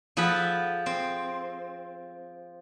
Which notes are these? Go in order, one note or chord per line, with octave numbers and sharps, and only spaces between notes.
F3 G#4 A4 F#5 B5
C4